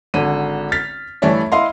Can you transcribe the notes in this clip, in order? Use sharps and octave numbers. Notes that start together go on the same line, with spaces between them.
G#1 D3 D#7
F6 A6 B6
G2 E3 A3 C#5 D5 E5
E4 D#5 F5 C6